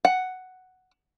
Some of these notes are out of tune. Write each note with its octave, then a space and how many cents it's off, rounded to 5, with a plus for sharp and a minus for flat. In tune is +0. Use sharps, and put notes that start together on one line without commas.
F#5 +5